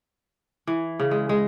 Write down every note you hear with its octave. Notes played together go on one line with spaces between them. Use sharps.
E3
C#3
G#3
G#3